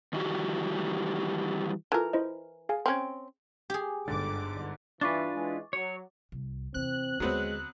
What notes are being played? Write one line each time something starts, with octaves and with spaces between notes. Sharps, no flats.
D#3 E3 G3 F#4 G4
E3 F4 A4 A#4 A5
E4 C5 D#5
G#4 F5 G#5
C4 C#4 F6 G#6
G4 G#4
G1 G#2 D3 D6 A6
G2 E3 D4 F4 B4 C#6 D6 A6
E3 G#3
F#3 C#5
C2
E2 C3 C4 F#6
D#2 D3 F#3 G#3 B3 C4